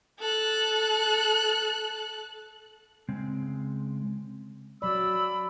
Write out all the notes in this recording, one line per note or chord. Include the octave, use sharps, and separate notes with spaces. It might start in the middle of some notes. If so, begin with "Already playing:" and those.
A4 F#6
C#3 G#3 C4
F#3 D5 B5 E6